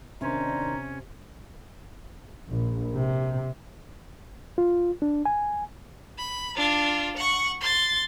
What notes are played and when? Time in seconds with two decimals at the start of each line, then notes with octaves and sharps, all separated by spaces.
0.21 C3 D#3 C#4 D4 C5 A#5
2.49 A#1
2.95 C3
4.58 F4
5.02 D4
5.25 G#5
6.18 B5
6.56 D4 F4
7.16 F#5 C#6
7.61 C6 A6